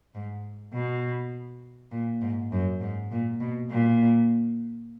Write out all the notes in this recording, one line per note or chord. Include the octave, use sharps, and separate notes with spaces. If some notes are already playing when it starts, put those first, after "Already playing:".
G#2
B2
A#2
G#2
F#2
G#2
A#2
B2
A#2